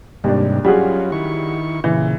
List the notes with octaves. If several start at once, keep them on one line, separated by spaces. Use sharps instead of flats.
D#2 G#2 C3 G3 D4
F#3 G3 C#4 F4 F#4 G#4
D#3 E4 C#6
A#2 C#3 E3